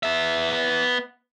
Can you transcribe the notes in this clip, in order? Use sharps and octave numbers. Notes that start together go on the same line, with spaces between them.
B3 E5